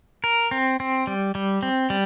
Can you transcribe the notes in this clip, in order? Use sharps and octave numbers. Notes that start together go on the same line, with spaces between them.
A#4
C4
C4
G3
G3
C4
G3